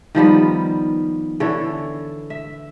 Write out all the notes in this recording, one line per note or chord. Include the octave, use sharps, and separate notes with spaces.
D#3 F3 G3 B3
D3 E3 A4 C#5
E5